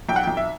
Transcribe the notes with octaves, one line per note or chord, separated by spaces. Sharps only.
B1 G5
F#5
B1 G5
E5